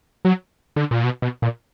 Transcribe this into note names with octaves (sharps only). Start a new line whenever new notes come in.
F#3
D3
A#2
B2
B2
A#2